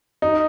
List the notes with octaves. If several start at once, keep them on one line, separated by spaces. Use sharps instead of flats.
D#4